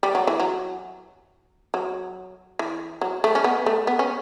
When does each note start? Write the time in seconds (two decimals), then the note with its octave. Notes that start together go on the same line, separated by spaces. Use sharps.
0.03 G3
0.15 F#3
0.27 E3
0.39 F#3
1.74 F#3
2.59 E3
3.01 F#3
3.24 A3
3.35 C#4
3.44 B3
3.66 A3
3.87 B3
3.99 C#4